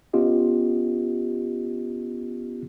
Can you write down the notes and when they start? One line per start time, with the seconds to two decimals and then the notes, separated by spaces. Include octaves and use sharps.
0.13 B3 C#4 F4 G4 D#5